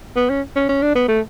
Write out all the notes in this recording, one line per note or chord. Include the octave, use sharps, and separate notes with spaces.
B3
C#4
C#4
C#4
D4
B3
A3